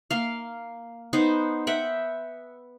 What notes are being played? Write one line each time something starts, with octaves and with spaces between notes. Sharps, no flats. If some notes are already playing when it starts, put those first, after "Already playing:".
A#3 F5
B3 D#4 C5
E5 F#5 G5